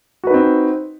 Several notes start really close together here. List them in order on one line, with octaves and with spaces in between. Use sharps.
F#4 B4 D#4 C4